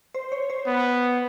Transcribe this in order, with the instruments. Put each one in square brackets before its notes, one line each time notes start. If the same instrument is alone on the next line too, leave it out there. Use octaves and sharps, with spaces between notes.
[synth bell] C5
C#5
C5
[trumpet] B3